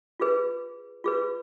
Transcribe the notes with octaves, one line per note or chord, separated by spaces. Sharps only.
F4 G#4 B4
F4 G#4 B4